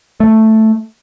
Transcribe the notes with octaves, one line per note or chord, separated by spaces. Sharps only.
A3